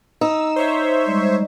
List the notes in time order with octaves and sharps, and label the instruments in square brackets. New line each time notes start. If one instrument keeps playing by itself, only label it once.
[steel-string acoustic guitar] D#4 [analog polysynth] E6
[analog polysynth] C5 C#5 E5
[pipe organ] G3 G#3